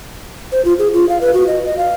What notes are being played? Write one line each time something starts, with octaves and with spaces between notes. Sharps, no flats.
C5
F4
G#4
F4
F5
B4
F#4
D#5
D#5
F5